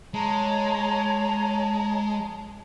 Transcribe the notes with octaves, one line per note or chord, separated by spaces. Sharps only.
G#3 C#5 A5 A#5